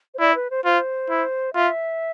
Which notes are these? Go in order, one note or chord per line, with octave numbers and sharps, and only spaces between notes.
C5
E4 D5
B4
C5
F4 C5
E4
F4 E5